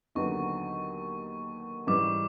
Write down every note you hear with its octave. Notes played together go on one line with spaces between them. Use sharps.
D#2 D3 F#3 B3 D#4 C#6
G#2 E3 G3 D6